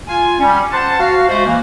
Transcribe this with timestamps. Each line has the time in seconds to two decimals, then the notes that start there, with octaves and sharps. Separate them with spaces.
0.07 F4 G#5
0.40 G3 C#4
0.72 C5 F#5 A5
0.99 F#4 F5
1.28 G#3 A3 F#4 C5
1.46 E3 A#3